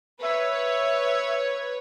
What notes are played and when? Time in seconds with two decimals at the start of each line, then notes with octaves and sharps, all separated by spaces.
0.22 B4 C#5 E5